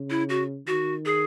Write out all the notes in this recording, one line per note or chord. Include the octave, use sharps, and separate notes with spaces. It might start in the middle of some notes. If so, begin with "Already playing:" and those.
Already playing: C#3
E4
F#4
D#3 F#4
G#4